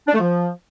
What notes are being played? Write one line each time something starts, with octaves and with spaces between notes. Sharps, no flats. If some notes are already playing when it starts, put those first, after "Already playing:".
D4
A3
F3